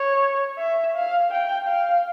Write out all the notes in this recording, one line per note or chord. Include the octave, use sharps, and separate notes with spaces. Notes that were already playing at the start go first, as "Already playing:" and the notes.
Already playing: C#5
E5
F5
G5
F5